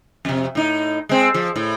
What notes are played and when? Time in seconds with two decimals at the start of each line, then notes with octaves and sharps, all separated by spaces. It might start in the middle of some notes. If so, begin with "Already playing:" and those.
0.25 F2 C3
0.55 A2 D#4
1.09 G#3 C4
1.34 F3
1.56 A2